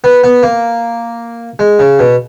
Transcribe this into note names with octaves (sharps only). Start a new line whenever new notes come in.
B3
B3
A#3
G#3
C#3
B2